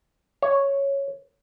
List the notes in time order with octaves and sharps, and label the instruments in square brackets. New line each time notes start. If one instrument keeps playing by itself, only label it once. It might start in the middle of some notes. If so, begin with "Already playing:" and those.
[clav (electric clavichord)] C#5